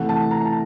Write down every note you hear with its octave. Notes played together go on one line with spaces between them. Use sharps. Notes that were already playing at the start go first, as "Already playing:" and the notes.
Already playing: C3 E3 A3 F#5
A5
A#5
A5